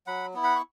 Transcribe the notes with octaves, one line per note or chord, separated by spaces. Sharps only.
F#3 F#5 B5
B3 E4
F#5 B5
C#6